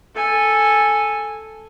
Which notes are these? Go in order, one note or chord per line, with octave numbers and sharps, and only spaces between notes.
A4 G#5